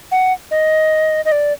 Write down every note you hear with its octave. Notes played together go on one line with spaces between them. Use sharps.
F#5
D#5
D#5
D5